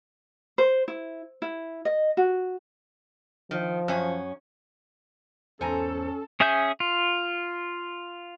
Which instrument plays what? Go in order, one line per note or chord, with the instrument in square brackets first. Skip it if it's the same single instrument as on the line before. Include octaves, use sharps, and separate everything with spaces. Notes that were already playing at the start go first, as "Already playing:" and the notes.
[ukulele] C5
E4
E4
D#5
F#4
[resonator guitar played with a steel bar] D#3 [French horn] F3
[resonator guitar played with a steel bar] F#2 C#4
[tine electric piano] E2 C5 C#7 [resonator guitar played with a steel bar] G#2 G#5 A#5 [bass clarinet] C#4 [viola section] A4
[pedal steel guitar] C#4 G#4 E5 G#5 G6
F4